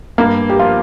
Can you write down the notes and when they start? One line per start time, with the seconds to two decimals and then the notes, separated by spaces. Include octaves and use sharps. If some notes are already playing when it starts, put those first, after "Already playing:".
0.18 G2 A#3
0.49 G4
0.58 F3 F4